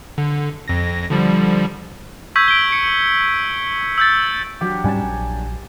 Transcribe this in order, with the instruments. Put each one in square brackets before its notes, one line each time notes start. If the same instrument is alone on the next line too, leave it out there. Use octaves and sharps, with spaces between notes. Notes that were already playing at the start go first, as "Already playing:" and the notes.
[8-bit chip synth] D3
F2 A#6
D3 F3 G3
[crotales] C#6 E6 G6 G#6 B6
D7 G7
C#7
E6 G6 A6
[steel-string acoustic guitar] F#3 D4 [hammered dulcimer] G4
[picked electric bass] G#2 G3 C#4 [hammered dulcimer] G#5 A5
[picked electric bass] A#1